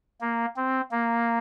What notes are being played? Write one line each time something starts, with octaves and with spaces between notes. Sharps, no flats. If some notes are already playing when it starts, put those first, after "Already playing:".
A#3
C4
A#3